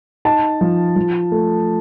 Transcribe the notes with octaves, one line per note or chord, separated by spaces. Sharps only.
D#4 A5
F3
F3
A3